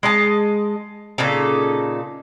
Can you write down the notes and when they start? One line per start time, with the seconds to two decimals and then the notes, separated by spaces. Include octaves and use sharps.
0.03 G#3 D#5 A5
1.18 A#2 C#3 D#4 A4